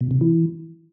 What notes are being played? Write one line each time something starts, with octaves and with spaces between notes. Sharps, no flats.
B2
C3
E3